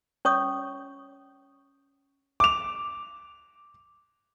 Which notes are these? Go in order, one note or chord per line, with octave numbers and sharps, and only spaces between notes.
C#4 C#5 C#6 D#6
D6 F7